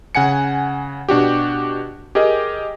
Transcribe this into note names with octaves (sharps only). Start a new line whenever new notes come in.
C#3 F#5 G#5 C#7
B2 D4 F#4 G4
G4 G#4 A#4 D#5